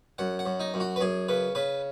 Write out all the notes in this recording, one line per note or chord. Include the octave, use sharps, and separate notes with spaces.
F#2 F#5
F#5
F#2
D#4
F#2
F#4
B4
F#2 G#4
C#3 B4
C#3 B4